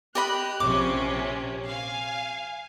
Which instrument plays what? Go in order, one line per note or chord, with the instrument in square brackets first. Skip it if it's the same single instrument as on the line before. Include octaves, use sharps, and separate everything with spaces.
[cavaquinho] G4 D#5 B5 [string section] F#6
[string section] A#1 C3 C#4 [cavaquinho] D6
[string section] F5 G#5